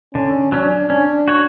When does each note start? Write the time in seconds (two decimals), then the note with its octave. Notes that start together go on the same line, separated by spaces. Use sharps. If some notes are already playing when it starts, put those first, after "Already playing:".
0.14 D3 C#4
0.52 F#3 C#4 D4
0.90 C#4 D4
1.28 F#4 C#5